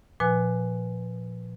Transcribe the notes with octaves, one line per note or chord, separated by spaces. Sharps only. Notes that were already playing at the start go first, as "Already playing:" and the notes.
A#2 F3 B4 G#5 F#6